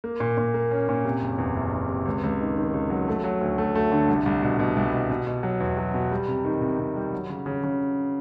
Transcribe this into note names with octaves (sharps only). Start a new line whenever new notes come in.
A#3
A#2
A#2
A#3
C#4
A#2
C3
F#1
E2
F#1
E2
C3
C#2
C#2
D#3
D#3
C#2
F#3
A3
F#3
D2
A3
A3
D3
C2
C2
B2
B2
C2
B2
B2
B2
F#3
E2
F#3
B2
G3
C3
D#3
C3
C3
G3
F#3
C#3
C#3
C#3